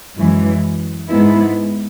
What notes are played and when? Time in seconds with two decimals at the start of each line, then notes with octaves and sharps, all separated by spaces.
0.17 F#2 E3 G#3
1.08 G#2 G#3 B3 E4